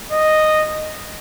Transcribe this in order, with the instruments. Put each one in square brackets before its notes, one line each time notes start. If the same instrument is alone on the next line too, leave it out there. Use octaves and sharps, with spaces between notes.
[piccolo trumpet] D#5